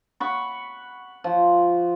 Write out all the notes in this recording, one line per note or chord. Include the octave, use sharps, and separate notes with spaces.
F#5 B5 C#6
F3